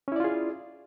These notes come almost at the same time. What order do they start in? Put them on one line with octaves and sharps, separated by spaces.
C#4 E4 D5 F4 G#4